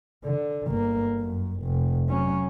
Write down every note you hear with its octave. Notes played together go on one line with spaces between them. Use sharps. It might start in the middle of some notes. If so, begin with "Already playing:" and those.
D3
G1 A#3
F#2
F1
F#3 C#4